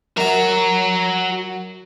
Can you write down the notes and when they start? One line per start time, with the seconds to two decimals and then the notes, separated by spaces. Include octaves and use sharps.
0.17 F#2 F#3 F#4 A#5